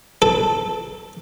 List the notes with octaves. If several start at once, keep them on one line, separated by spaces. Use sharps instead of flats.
A4